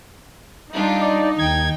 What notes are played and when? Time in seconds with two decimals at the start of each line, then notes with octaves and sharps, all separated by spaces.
0.73 G3 D4 D#4 F4
1.01 D5
1.39 D#2 G5 G#6